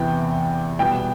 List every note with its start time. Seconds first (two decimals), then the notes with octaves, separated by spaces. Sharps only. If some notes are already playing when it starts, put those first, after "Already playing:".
Already playing: E2 C3 E3 B3 G5
0.79 B2 G3 B3 G5